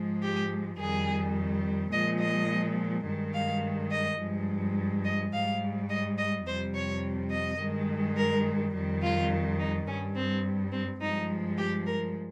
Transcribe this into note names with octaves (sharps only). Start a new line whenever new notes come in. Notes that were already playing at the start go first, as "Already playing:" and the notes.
Already playing: G#2 F3 G#3
G4
F2 D#3 G3 G#4
A#2 F3 G#3 D#5
D#5
G2 D#3 G#3
F5
D#5
G2 F3 G#3
D#5
G#2 G3 F5
D#5
D#5
F2 C3 G3 C5
C#5
D#5
G2 D#3 G#3
A#4
F2 D#3 G3
F4
D#4
G2 G3 C#4
C4
C4
G2 F3 G#3 D#4
G4
A#4